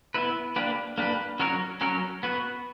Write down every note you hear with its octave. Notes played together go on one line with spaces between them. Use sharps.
B3 E4 B4
A#3 D4 G4 B4
A#3 D4 G4 B4
F#3 C#4 F#4 A#4 C#5
F#3 C#4 F#4 A#4 C#5
B3 F#4 B4